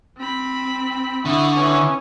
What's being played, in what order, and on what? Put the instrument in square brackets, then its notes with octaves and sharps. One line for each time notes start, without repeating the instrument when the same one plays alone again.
[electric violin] C4 B5
[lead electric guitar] D3 [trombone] E4 [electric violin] C#6 D#6
[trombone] E3 [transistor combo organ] C#4